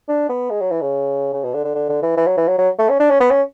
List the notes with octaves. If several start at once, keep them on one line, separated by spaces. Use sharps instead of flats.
D4
B3
G#3
F#3
E3
C#3
C#3
B2
D3
D3
D3
D3
E3
E3
F#3
E3
F#3
F#3
A3
C#4
D4
C#4
B3
C#4